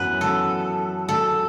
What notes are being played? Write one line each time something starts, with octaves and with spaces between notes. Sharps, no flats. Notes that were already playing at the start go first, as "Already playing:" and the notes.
Already playing: F#2 E3 B3 B4
A4
A4